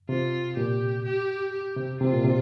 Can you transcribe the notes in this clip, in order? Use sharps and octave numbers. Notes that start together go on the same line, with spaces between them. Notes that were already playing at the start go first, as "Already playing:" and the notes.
C3 F4
A#2 G4
G4
G4
C3
C3 F4
A#2
C3